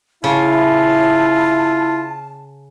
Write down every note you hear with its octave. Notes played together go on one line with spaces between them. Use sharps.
C#3 E4 F4 A5